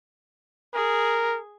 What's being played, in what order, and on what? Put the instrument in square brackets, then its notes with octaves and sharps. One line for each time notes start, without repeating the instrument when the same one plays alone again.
[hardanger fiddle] G#4 [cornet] A#4